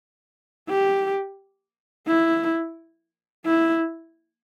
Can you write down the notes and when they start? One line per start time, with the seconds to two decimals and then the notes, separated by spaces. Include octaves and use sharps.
0.69 G4
2.08 E4
3.46 E4